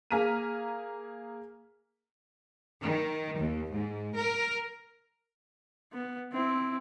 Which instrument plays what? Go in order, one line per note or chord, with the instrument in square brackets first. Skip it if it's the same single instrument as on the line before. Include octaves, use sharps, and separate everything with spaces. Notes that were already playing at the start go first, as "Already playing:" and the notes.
[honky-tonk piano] A#3 G#4 A#5 F6 B6 D#7
[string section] D#3
D#2
G#2
A#4
[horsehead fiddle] B3
C4 E4